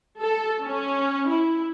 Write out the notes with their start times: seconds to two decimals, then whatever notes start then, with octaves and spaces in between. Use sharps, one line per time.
0.20 A4
0.63 C#4
1.29 E4